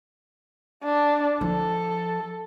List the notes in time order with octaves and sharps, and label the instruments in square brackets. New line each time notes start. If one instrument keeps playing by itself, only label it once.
[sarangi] D4
[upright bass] F3 [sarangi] A4